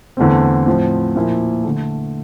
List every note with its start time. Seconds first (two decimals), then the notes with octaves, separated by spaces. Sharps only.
0.17 E2 D3 A3 C4
0.67 A2 F3 C4
1.16 A#2 F3 A#3 E4
1.64 D3 A3